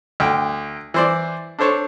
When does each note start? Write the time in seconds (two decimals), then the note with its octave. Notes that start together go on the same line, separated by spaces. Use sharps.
0.20 D2 G5
0.94 E3 C5 D5
1.59 D4 A4 C5 C#5 A5